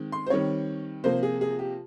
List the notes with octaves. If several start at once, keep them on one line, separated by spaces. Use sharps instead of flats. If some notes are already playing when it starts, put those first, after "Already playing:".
Already playing: D#3 G#3 C4
C6
C5
D#3 G3 C4 C#5
C3 F3 A#3 C5
G#4
G#4
G4